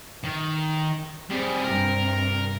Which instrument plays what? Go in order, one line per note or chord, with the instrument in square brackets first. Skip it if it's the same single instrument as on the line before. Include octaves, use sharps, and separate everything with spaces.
[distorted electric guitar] D#3
[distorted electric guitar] G3 G#4 [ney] C4
[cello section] G2 C3 G3 [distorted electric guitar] A#4